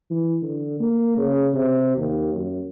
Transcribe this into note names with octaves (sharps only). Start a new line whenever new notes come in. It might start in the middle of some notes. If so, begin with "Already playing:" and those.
E3
D3
A#3
C#3
C3
D#2
F#2